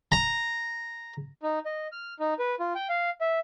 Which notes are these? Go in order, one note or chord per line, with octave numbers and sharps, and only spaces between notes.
A#5
D#4
D#5
F6
D#4
B4
F4
G5
F5
E5